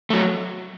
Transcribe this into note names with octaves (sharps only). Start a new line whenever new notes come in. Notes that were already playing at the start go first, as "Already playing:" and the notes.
F#3 A3